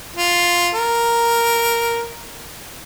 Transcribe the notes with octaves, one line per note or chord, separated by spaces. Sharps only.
F4
A#4